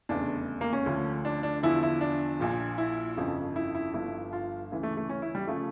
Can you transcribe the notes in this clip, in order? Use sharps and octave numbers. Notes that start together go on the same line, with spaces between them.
F1 E2 C#3 D4
A#3
C#4
D2 D3 F3
D4
D4
E2 D3 F3 E4
E4
D4
A#1 A#2 F3
E4
G1 F2 C#3 F3
E4
E4
G1 G2 F3 E4
F4
D2 C#3 E3
A3
A3
C#4
E4
G3
C#3 F3 A3